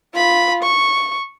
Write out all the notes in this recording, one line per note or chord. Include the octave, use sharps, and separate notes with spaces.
F4 B5
C#6